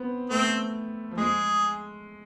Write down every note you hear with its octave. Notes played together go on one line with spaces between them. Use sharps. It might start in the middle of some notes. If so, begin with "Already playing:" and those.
Already playing: B3 C4
A3 C4
F3
G#3 G#4